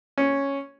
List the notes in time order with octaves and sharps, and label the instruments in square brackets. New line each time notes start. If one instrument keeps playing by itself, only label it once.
[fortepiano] C#4